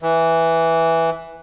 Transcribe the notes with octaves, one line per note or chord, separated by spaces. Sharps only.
E3